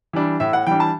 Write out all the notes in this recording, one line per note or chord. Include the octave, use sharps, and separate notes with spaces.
E3 G3 D4
A2 E5
F#5
E3 G3 D4 G5
A5